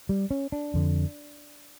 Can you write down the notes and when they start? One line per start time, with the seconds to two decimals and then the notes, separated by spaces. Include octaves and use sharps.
0.09 G3
0.31 C#4
0.52 D4
0.74 F2 D3